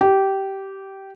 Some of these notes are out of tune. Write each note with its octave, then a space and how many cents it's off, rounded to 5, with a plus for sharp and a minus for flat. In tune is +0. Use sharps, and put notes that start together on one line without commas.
G4 -15